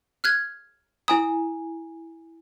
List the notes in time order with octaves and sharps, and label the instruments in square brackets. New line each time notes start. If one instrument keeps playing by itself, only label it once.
[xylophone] F6 F#6 G#6
[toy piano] E4 G#5 A#5 [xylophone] D#6